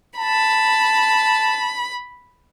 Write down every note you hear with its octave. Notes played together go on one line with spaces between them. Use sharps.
A5 B5